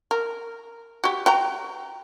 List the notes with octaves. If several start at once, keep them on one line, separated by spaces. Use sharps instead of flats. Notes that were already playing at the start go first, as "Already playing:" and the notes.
A#4
F#4 G4
F#4 G5 A#5